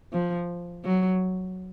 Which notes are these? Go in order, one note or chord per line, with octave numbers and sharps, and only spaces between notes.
F3
F#3